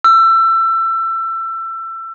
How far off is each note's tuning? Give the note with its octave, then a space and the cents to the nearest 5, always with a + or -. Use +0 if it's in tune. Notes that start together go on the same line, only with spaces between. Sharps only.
E6 +25